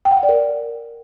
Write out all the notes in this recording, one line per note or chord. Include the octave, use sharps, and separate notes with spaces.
G5
F#5
G5
D5
A#4